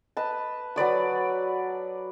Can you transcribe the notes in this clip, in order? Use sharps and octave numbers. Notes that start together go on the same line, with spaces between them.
B4 D#5 A5
F#3 B4 D5 D#6